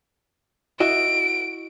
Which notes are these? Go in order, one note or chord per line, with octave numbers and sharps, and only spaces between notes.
E4 F#4 D#5 D7